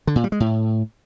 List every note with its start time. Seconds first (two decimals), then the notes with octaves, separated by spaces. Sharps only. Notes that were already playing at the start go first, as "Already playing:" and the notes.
0.07 D3
0.16 A#2
0.24 G3
0.32 G#3
0.40 A2